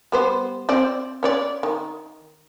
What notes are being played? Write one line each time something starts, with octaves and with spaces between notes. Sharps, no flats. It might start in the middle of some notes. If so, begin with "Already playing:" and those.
G3 B3 C5
C4 C5 D5
C#4 C#5 D5
D#3